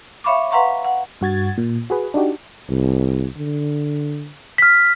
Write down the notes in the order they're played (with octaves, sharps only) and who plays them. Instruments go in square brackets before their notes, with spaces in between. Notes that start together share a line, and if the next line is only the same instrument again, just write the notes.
[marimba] C#5 E5 F5 B5 C#6 D6
B4 F5 F#5 A#5 C6 C#6
F#5
[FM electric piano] G2 F#4 G#6 A6
A#2
F#4 G#4 B4
D4 D#4 F#4 G4
[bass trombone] C2
D3
[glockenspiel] F6 B6